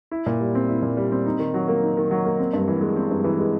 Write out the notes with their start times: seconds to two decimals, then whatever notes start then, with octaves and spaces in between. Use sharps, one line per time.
0.11 E4
0.26 A#2
0.40 G3
0.55 C4
0.69 E4
0.82 A#2
0.97 G3
1.12 C4
1.26 D#4
1.39 D#3
1.54 F#3
1.68 A#3
1.83 D#4
1.97 D#3
2.11 F#3
2.25 A#3
2.39 C4
2.53 G2
2.68 E3
2.81 G#3
2.96 C4
3.10 G2
3.24 E3
3.39 G#3